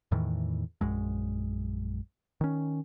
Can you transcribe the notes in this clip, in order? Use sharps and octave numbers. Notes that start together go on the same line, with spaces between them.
E2 A2 D#3 E3
A#1 F#2 G#3
D#3 C#4